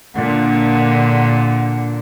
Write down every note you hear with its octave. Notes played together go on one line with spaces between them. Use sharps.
A#2 D3 F#5